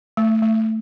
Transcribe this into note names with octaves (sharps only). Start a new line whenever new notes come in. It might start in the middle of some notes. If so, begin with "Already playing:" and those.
A3
A3